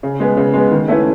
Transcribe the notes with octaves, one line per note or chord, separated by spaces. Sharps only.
C#3
G#3 B3
C#3
G#3 B3
D#3
A3 C#4 E4 B4